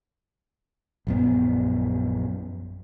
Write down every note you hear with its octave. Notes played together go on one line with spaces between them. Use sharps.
A#1 F#2 B3